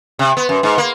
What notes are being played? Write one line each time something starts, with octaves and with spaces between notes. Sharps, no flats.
C3
B3
F#2
G#2
A#3